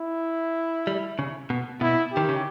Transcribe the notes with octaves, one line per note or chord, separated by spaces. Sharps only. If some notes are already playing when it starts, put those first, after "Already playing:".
Already playing: E4
G3
C#3
B2
B2 E4
D#3 G4
C#3